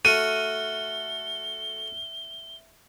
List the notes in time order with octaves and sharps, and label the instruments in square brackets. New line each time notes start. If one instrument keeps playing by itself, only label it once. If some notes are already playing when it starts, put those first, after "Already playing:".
[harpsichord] A3 F#4 [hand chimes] E5 F6 F#6 [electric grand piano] D#7 [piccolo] G7